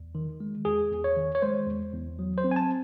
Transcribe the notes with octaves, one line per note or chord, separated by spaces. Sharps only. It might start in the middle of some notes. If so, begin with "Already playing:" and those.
Already playing: E2
D#3
G#3
E2 G#4
E2
C#5
D#3
C#5
G#3 C5
E2
E2
F#3
C5
C4
G#5
A5